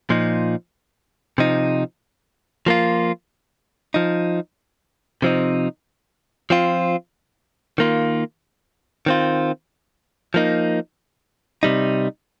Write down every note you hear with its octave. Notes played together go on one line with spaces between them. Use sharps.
A#2 F3 D#4
C3 F3 D#4
F3 A#3 F4
F3 D#4
C3 F3 C4 D#4
F3 C4 F4
D#3 A#3 F4
D#3 C4 F4
F3 A#3 D#4
C3 G3 D#4